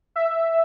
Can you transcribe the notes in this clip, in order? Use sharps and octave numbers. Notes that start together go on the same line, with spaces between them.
E5